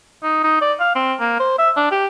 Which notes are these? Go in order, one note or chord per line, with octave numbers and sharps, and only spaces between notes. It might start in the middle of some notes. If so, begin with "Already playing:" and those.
D#4
D#4
D5
F5
C4
A#3
C5
E5
D4
G4